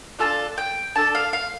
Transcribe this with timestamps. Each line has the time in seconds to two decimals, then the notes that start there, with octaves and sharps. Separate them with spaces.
0.19 D4 F4 A4 A5
0.58 G5
0.95 D4 A4 A5
1.15 F5
1.33 F5